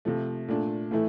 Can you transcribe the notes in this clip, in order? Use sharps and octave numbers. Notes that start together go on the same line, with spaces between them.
C3 F3 A3
A#2 A3 D4
A2 E3 A3 E4